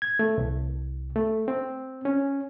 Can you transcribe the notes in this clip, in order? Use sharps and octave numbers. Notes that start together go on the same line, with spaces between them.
G#6
A3
C2
A3
C4
C#4